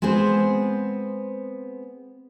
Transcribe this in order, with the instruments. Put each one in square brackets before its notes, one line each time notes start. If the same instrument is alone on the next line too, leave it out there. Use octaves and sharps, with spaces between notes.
[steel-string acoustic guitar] G#3 B3 C4 G#4 C5